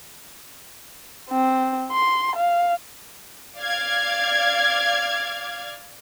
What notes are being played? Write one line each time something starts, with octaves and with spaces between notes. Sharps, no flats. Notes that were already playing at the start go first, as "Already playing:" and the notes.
C4
C6
F5
D5 F5 D6 F6 G#6